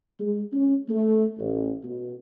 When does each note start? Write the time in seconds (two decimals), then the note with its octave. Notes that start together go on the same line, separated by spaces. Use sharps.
0.20 G#3
0.53 C#4
0.89 A3
1.39 A1
1.84 B2